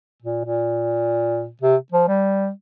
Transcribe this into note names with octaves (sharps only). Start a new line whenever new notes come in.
A#2
A#2
C3
F3
G3